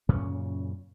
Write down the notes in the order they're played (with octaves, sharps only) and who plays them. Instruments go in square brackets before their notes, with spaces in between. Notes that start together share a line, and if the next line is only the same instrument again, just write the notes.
[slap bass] F#2 A#2 C#3 C#4